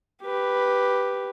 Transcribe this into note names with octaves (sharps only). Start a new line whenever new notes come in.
G4 B4